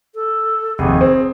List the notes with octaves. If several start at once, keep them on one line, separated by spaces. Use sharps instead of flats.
A4
F1 D#2 G#4
C4